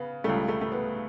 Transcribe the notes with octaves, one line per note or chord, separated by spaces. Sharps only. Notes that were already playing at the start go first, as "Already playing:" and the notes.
Already playing: C#3 B3
C#2 C#3 G3 A3
A3
A3
B3